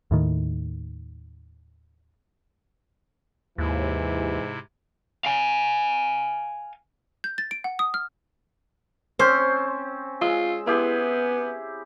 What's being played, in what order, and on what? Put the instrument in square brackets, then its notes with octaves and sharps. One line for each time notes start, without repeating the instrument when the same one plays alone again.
[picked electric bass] D#2 A2 D#3
[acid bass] D#2 [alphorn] G#2 [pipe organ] C3 E4 [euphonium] E3
[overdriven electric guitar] F5 G#5
[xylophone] G6
A6
D7
F#5
D#6
F6
[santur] C4 C#4 [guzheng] C5
[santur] G#3 E6 [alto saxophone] F4
[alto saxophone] B3 [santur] E4 G4 G#4